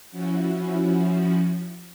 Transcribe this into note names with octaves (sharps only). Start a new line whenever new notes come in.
F3 C#4 E4 F#4